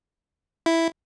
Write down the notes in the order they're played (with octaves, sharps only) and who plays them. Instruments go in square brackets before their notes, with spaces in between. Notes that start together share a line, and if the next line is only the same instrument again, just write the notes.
[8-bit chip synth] E4